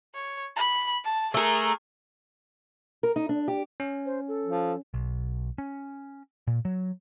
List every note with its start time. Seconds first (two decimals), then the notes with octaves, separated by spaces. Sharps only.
0.15 C#5
0.56 B5
1.05 A5
1.34 A3 G#4 A#4
3.03 A#4
3.16 D#4
3.29 D4
3.48 G4
3.80 C#4
4.06 C5
4.28 A4
4.44 F3
4.94 B1
5.58 C#4
6.47 A#2
6.65 F#3